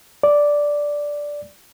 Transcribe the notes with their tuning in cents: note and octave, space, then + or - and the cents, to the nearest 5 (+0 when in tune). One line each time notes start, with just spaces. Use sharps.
D5 -5